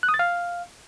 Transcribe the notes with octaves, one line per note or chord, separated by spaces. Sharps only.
F#6
D#6
A6
F5